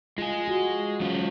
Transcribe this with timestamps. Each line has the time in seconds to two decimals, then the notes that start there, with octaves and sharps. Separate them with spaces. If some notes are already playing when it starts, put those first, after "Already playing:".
0.18 G#3 F4 G#4
0.48 F#4
1.01 F#3 G#3 C#4 F4